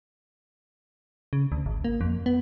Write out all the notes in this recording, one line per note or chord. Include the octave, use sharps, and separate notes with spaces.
C#3
D2
G#1
A#3
F2
B3